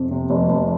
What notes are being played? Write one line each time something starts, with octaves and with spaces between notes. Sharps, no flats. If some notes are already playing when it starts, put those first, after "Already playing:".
Already playing: F2 C3
C3
F1
F1